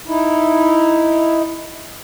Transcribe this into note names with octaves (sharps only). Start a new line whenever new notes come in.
D#4 E4